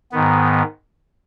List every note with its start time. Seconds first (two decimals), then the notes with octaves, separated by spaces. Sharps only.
0.12 G#2 D#3 B3